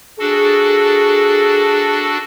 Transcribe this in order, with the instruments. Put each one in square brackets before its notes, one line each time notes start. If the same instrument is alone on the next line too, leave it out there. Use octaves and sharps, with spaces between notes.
[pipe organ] D4 F#4 A4 [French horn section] G#4